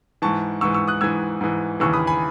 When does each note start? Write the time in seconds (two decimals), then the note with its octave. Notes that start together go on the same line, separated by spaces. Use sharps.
0.22 G#2 E3 A5 C#6
0.61 G#2 E3 C#6 E6
0.74 C#6 E6
0.88 D#6 F#6
1.01 G#2 E3 E6 G#6
1.41 G#2 E3
1.80 D#2 C#3 E3 C#6 E6
1.93 B5 D#6
2.07 G#5 B5